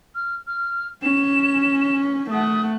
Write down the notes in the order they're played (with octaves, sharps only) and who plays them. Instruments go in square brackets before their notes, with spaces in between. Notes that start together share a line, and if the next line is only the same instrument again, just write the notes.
[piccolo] F6
F6
[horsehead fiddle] C#4 [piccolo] E7
[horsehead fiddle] A3 F#5 [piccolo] D#6